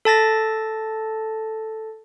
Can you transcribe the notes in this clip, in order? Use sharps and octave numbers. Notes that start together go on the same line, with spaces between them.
A4 A5 A6 A#6